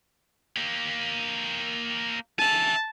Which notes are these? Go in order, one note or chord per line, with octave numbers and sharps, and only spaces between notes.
A#3 G4
E5 G#5 A5